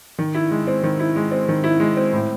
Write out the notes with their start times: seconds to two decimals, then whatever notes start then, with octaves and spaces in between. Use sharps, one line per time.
0.18 D#3
0.34 E4
0.51 G#3
0.67 C4
0.83 D#3
1.00 E4
1.16 G#3
1.31 C4
1.48 D#3
1.64 E4
1.80 G#3
1.97 C4
2.13 A2